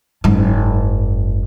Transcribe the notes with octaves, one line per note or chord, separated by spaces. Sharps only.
F#1 G#2